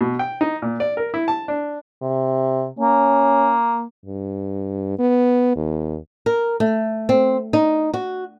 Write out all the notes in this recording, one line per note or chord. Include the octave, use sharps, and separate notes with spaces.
B2
G5
D#4
A#2
D5
A#4
E4
A5
D4
C3
A#3 C#4
G2
B3
D#2
A#4
A3
C4
D#4
F#4